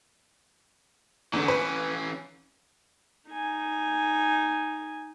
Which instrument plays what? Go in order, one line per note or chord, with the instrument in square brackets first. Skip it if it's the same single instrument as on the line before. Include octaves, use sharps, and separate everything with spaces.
[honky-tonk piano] E2 D3 [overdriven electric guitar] E3 C#4
[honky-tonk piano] B4
[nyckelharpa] D#4 G#5